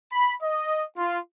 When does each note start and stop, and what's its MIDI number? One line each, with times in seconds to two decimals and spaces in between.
0.11 0.34 83
0.42 0.84 75
0.98 1.19 65